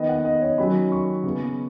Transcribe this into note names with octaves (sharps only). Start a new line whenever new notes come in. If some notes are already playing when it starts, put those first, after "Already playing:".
Already playing: D#3 B3 D#5
F#5
D#5
C#5
D#3 F#3 C#4 B5
C#6
C#3 B3